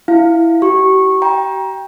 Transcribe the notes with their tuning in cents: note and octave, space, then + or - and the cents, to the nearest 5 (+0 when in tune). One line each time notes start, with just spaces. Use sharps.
E4 +5 F5 +0
G4 -45 C#6 -15
G5 +10 A#5 +25